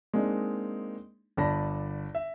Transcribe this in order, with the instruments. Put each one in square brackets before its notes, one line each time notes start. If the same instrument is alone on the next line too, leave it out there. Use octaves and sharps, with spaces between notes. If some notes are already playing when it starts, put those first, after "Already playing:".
[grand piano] G#3 A#3 C4 D4 D#4
G1 D5 A5 B5 A#6
E5